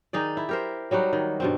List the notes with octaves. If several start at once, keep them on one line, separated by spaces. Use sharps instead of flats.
D#3 D#4 G#4 D5
E4
G4 A#4 C5
F#3 G3 D#4 F#4
D#3
G2 B2 C4